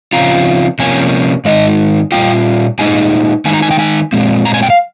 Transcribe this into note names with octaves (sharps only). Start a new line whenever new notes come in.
C#3 F3 C4 F4 A#5
C3 F3 A#3 C#4 G#5
G#2 D#3 G#3 D#4 D#5
A#2 G3 C4 F4 G5
A#2 G#3 D#4 G#5
D#3 G#3 D#4 G#5
A#5
G#5
G5
G#5
A#2 G#3 C4
A#5
G#5
G5
F5